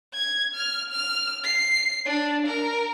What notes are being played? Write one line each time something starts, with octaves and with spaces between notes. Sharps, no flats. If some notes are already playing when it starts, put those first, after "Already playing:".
G#6
F6
F6
C7
D4
A#4